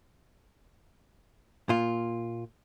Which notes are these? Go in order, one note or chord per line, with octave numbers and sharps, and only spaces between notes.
A#2 F4